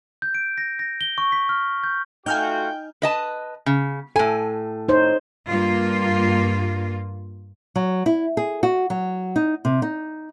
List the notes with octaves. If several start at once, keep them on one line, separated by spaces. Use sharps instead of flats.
G6
D7
A#6
A#6
G7
C#6
B6
F6
G6
A3 D#4 F4 F#4 G5 G#5 F6 G6
B4 D#5 A5
C#3
A2 A4 G#5
D#4 C5 C#5
G2 A#3 F4
F#3
E4
G#4
F#4
F#3
D#4
C3
D#4